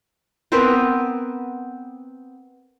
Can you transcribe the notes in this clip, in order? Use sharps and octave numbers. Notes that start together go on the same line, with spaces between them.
B3 C4 A#4 B4